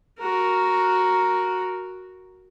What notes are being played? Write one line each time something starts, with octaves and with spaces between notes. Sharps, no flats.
F#4 A#4